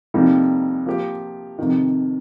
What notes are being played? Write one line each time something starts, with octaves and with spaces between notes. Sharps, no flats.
F2 C3 G3 A#3 D#4
F3 A#3 G4
F2 C3 D#3